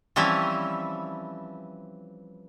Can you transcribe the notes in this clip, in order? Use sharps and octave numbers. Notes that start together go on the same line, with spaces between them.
E3 F3 G3 C4 C#4 E4